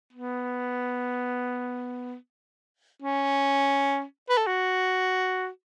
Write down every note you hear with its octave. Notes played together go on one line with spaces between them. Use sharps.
B3
C#4
B4
A4
F#4